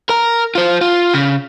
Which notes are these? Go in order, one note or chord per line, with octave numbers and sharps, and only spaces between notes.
A#4 A#5
F4 C5
F4
C#3